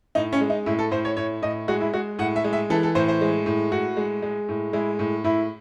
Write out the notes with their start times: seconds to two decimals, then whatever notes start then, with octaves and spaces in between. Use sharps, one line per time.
0.15 A2 D#4
0.33 C#4
0.41 G#3
0.50 D#4
0.66 A2 E4
0.79 A4
0.91 A2 C5
1.05 C#5
1.17 A2 C#5
1.42 A2 D#5
1.68 G#3 F#4
1.81 E4
1.94 G#3 F#4
2.19 A2 F#5
2.36 E5
2.44 G#3
2.53 E5
2.70 E3 A4
2.83 A4
2.95 A2 C5
3.08 C5
3.21 G#3
3.46 A2
3.72 A2 F#4
3.97 G#3
4.22 G#3
4.49 A2
4.73 G#3 E4
4.99 A2
5.24 A2 E4